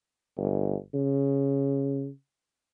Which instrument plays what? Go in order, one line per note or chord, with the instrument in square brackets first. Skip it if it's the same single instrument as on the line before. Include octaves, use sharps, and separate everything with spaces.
[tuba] G1
C#3